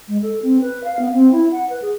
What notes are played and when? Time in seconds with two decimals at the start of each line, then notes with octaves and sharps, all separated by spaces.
0.08 G#3
0.22 A4
0.43 C4
0.61 B4
0.84 F5
0.99 B3
1.14 C4
1.32 E4
1.52 F#5
1.70 B4
1.82 G#4